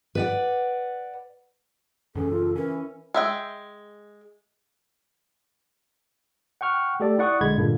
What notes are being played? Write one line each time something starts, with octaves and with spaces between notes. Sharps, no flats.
B4 D5 F#5
F#2 C#3 E3 C#4 A4
F4
E3 C#4 A#4
G#3 E5 G5
F#5 G5 C#6 F6
A3 G4 A4 D5
E4 D5 F#5 C#6 D#6
B1 D3 G#3 B5 G#6
G2 A#2 D3 A#3